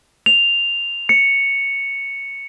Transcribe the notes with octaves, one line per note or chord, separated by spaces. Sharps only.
F7
C#7